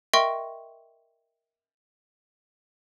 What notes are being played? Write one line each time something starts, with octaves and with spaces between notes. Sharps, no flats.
A#4 D#5 E5 G5 C6 C#6